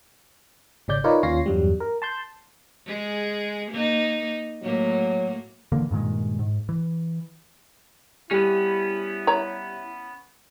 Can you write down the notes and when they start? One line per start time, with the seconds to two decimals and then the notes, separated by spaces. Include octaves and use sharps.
0.88 G#1 C#3 C#4 D5 G6
1.04 D#4 F4 A#4 B4 C#5 D5
1.23 D#2 C#4 F4 C#5 A#6 C7
1.46 E2 G2 F#3 G3
1.80 A#4
2.02 A5 C6 G6
2.86 G#3 G#4
3.72 A#3 D#4
4.63 A2 F#3 A#3
5.72 D3 E3 F3 A#3
5.91 G2 A#2 D#3 G#3
6.39 G#2
6.69 E3
8.31 G3 B3 C#4 E4
9.27 C#5 A#5